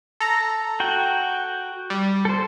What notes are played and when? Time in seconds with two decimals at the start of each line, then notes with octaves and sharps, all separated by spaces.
0.21 A4 A#5
0.80 F#4 G5
1.90 G3
2.25 A4 C5